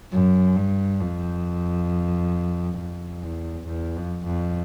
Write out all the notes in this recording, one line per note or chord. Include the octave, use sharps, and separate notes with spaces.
F#2
G2
F2
F2
E2
E2
F2
F2